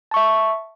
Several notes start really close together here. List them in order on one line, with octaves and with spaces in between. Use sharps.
A5 C#6 E5